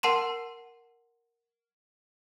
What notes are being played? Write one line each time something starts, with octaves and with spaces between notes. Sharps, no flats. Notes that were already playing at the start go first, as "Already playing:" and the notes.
A#4 F#5 A5 C6 E7